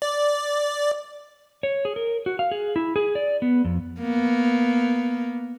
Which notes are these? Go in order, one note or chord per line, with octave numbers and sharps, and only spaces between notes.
D5
C#5
G#4
A#4
F#4
F5
G#4
E4
G#4
D5
B3
F2
A#3 B3